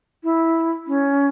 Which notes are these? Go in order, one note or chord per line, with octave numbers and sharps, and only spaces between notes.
E4
C#4